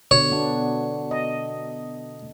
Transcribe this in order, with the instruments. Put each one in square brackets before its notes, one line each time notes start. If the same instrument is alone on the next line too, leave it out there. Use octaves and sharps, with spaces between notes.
[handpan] B2 D3 [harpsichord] C#5
[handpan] B3 D4
D#5